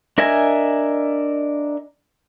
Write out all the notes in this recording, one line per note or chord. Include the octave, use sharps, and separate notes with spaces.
D4 A#4 D#5 E5 G#5